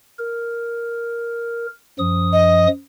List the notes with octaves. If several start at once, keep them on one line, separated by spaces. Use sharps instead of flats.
A#4
F#2 F3 D#6
D#5